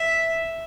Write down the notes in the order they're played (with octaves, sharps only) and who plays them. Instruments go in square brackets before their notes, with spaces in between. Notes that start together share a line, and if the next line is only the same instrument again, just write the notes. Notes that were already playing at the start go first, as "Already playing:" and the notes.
Already playing: [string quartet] E5